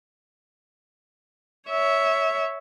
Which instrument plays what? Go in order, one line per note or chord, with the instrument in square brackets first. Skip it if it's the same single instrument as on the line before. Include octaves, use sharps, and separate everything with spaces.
[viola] C#5 E5